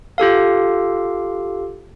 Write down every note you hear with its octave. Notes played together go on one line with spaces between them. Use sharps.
F4 G4 A4 F5